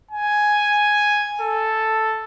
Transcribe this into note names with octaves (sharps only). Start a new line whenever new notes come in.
G#5
A4